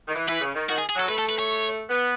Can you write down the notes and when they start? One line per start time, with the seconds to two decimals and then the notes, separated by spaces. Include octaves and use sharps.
0.08 D#3
0.15 E3
0.28 E3 B4
0.41 C#3
0.55 D#3
0.69 D#3 F#4
0.78 G#4
0.89 G#4
0.96 F#3 A4
1.09 A3 B4
1.19 A4
1.29 B4
1.39 C#5
1.90 B3